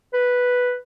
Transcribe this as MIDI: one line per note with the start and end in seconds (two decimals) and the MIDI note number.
0.14 0.75 71